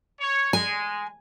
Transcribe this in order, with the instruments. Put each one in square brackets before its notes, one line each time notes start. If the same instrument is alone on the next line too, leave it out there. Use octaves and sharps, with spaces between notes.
[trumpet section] C#5
[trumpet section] G#3 [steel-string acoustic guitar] G#5